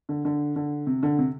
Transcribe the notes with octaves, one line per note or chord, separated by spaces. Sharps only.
D3
D3
D3
C3
D3
C3